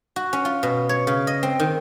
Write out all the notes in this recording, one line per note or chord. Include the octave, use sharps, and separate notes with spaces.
F#4
C#4
F4
B2
C#5
C#3
D#5
C4
D#3